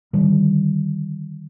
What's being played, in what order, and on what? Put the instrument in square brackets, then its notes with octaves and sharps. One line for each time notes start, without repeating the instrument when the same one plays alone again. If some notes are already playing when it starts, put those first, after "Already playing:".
[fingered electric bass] D3 D#3 G3